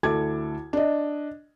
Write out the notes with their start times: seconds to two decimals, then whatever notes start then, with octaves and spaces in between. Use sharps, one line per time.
0.03 D2 E4 A4 A5 D6 G#6
0.73 D4 D#5